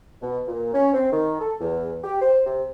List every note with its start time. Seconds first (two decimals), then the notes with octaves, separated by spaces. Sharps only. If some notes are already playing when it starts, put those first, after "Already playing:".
0.22 B2
0.48 A#2
0.74 C#4
0.94 C4
1.12 D#3
1.40 A4
1.60 E2
2.04 G4
2.22 C5
2.46 C3